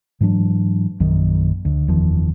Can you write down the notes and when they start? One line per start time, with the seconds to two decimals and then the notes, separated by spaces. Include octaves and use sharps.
0.21 G#2 E3 F#3 D4
1.00 A#1 F#2 D#3
1.65 D2
1.88 F#1 E2 D#3 F3